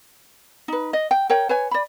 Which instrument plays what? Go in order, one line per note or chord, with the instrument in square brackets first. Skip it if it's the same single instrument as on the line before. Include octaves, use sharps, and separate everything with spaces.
[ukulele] D#4 B4
D#5
G5
A#4 C#5 G5
B4 C#5 G#5
D5 B5